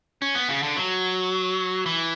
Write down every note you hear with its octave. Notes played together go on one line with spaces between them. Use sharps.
C#4
B3
C#3
D3
F#3
E3